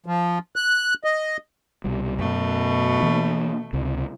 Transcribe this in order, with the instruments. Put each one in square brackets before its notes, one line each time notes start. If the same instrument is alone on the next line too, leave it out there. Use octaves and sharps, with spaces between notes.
[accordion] F3
F#6
D#5
[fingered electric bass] C2 B2 G3
[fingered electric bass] F#2 [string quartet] B2 A3
[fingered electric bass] E3 A#3 D4
C#2 C3